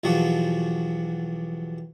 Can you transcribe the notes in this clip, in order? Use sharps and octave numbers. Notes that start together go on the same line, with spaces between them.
B1 E2 F3 F#3 F#4 G4